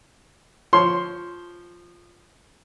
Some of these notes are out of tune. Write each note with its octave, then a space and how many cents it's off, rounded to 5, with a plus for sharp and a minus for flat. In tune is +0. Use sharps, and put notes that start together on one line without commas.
F3 +0 C#5 +0 C6 +0